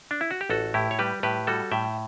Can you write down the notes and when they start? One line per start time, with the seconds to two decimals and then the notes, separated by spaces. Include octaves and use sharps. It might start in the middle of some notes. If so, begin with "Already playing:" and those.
0.11 D4
0.21 E4
0.31 F#4
0.41 G4
0.50 A1 F#4 A4
0.74 A2 E4 G4
0.91 C#5
0.99 G3 G4 B4
1.23 A2 G4 B4
1.47 G3 F#4 A4
1.71 A2 E5 G5